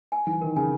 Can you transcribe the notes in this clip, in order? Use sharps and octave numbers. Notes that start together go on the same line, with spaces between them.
G#5
E3 G#5
D#3 A#4
C#3 G#5